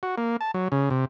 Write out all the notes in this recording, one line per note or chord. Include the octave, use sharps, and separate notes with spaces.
F#4
A#3
A5
F#3
C#3
C3